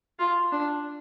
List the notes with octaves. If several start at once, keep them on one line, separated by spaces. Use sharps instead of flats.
F4
D4